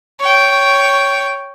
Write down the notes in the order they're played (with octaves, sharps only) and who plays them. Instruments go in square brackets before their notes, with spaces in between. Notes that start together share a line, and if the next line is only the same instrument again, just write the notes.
[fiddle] C#5 G5